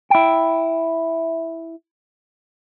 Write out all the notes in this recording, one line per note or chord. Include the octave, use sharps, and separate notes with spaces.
E4 G5